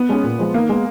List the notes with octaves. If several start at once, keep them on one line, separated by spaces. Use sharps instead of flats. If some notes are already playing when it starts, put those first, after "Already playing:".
Already playing: B3
G#3 C#4 G#4
A#2
F3 G#3
D#3 A#3
G#3 B3